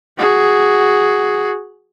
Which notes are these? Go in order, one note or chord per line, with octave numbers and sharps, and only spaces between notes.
F#4 G#4